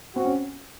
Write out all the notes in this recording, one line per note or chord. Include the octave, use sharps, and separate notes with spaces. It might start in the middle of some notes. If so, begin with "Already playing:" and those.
C4 F#4
C#4